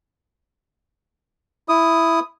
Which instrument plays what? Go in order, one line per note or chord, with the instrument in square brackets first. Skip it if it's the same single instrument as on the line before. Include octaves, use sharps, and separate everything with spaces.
[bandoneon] E4 D#6